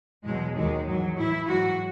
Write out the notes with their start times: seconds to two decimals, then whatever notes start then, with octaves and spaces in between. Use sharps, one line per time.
0.24 E2 B2 F#3 G#3
0.55 D#2 D#3 F#3 G#3
0.86 G#2 E3 F#3
1.17 A2 E3 E4
1.48 G#2 F#3 F#4